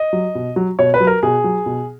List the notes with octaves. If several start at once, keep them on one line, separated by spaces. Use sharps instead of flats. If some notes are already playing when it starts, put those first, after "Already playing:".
Already playing: D#5
F#3
B2
F#3
B2 C#5
B4
F#3
A#4
B2 G#4
F#3
B2